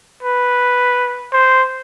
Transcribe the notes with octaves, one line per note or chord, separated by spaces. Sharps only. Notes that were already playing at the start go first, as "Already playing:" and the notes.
B4
C5